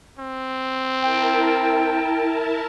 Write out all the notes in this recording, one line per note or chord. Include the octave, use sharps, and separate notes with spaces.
C4
E4 A#4 G5 A5